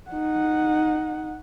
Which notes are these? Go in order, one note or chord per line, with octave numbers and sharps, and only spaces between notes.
D#4 F#5